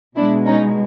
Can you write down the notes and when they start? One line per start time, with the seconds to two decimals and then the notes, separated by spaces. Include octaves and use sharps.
0.16 B2 G#3 D4 E4
0.46 C#4 D#4